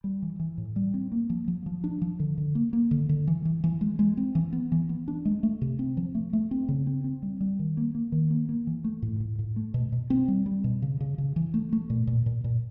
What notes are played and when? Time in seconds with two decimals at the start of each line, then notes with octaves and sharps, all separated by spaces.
0.04 G3
0.22 E3
0.40 E3
0.58 A2
0.76 G3
0.94 C4
1.12 A#3
1.30 F3
1.48 F3
1.66 F3
1.84 D4
2.02 F3
2.20 D3
2.38 D3
2.55 A#3
2.73 A#3
2.91 D3
3.09 D3
3.28 E3
3.45 E3
3.64 E3
3.81 G#3
3.99 G#3
4.17 C4
4.35 E3
4.53 B3
4.72 E3
4.89 B3
5.08 D4
5.25 G#3
5.43 A3
5.62 C3
5.79 C4
5.97 F3
6.15 A3
6.33 A3
6.51 C4
6.69 C#3
6.87 C4
7.04 C4
7.22 G3
7.41 G3
7.59 D#3
7.77 A#3
7.95 A#3
8.12 D#3
8.30 A#3
8.49 A#3
8.67 E3
8.84 A3
9.02 A2
9.20 A2
9.39 A2
9.56 A3
9.74 B2
9.92 B2
10.10 C4
10.28 G3
10.46 G3
10.64 B2
10.82 C#3
11.01 C#3
11.18 C#3
11.36 E3
11.54 A3
11.73 A3
11.90 A#2
12.07 A#2
12.26 A#2
12.44 A#2